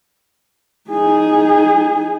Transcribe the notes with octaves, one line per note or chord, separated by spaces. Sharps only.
D#4 G#4